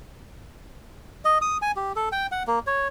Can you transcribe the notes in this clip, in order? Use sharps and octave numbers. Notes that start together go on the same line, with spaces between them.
D#5
D#6
G#5
G4
A4
G5
F#5
A#3
C#5